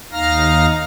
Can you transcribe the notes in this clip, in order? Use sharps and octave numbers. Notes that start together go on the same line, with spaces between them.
D#2 D#4 F5 A#5 F6 A#6